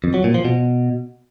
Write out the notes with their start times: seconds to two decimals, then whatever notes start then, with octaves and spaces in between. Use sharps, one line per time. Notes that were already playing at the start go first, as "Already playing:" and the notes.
0.04 F2
0.14 F#3
0.24 A#2
0.34 F3
0.45 B2